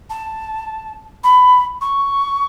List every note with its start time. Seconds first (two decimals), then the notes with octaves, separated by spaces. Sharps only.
0.09 A5
1.23 B5
1.81 C#6